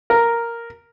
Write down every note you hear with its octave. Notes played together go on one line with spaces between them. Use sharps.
A#4